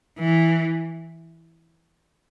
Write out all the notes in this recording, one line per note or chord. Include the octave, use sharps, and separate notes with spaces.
E3